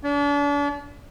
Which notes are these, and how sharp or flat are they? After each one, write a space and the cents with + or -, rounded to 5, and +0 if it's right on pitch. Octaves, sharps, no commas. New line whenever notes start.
D4 -40